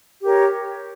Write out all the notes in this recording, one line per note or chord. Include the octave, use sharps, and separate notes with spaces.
G4 A#4 C#5